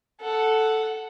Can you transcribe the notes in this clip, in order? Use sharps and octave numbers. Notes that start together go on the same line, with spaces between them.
A4 F#5